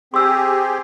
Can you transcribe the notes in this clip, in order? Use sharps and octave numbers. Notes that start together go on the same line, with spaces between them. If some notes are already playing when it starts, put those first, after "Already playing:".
C4 G4 G#4 C6 E6